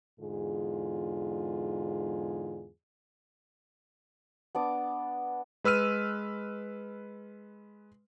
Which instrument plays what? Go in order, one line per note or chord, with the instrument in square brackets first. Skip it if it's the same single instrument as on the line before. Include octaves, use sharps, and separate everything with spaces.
[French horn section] E2 G#2 D3 F4 G#4
[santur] B3 D4 D6
[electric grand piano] G#3 B4 E6 F6 D#7